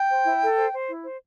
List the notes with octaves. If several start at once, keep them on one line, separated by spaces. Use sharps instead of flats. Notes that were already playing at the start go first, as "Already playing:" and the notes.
Already playing: G5
C5
E4
A4
C5
C5
E4
C5